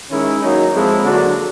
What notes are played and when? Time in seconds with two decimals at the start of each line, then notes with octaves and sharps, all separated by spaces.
0.11 D#3 G#3 C#4 E4 G#4
0.41 F#3 A#3 D#4
0.73 F3 G#3 C4 E4 A4
1.02 D3 F#3 A#3 D4 F#4